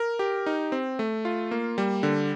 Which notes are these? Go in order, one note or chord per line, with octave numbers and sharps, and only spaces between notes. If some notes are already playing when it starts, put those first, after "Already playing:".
Already playing: A#4
G4
D#4
C4
A3
F4
A#3
G3
D3